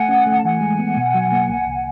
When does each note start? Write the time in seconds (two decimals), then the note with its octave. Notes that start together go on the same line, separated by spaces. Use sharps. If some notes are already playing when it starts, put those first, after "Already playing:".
Already playing: A3 F#5 G#5
0.09 C#4
0.27 A3
0.37 A5
0.43 E3 F#5 G#5
0.61 G#3
0.79 B3
0.97 B2
1.14 F#3
1.32 A#3
1.49 C2
1.67 C2